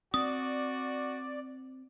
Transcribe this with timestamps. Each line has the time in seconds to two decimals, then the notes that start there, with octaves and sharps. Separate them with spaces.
0.14 C4 F#4 D5 D#6